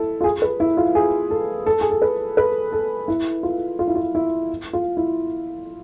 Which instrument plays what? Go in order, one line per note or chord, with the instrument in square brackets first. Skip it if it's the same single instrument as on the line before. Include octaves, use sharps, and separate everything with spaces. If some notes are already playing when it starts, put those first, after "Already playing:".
Already playing: [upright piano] E4 A4
F4
G#4
B4
E4
F4
G#4
A4
A4
G#4
A4
B4
B4
A4
E4
F4
F4
E4
F4
E4
F4
E4